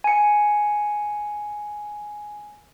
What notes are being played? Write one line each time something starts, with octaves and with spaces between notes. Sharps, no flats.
G#5 C#7